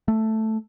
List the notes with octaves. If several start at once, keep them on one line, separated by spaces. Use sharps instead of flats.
A3